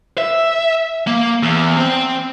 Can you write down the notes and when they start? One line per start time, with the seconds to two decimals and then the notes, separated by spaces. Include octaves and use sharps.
0.18 E5
1.07 A#3
1.43 E2
1.77 C4